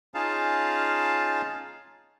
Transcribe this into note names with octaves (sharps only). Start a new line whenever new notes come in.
C#4 D#4 F4 G#4 F5 A5